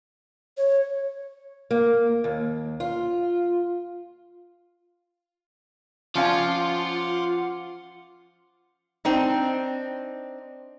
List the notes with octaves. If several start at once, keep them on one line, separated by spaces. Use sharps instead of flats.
C#5
A#3
D#2
F4
F3 C#4 F4 F5 F#5 C6 D6
C4 D4 D#4